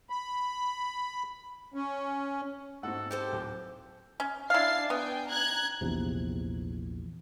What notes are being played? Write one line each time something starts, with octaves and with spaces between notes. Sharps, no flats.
B5
C#4
G#2 C4 F#4 A4 F#5
G4 A4 C5 G5 C#7
D1
C#4
D4 E4 F5 A6 C7
B3 G5 G#5
A#5 F#6 G#6
A#1 E2 C3